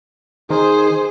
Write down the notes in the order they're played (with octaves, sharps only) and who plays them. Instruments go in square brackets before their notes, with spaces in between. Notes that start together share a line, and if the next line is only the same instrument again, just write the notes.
[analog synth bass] D#3 [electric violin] G#4 C5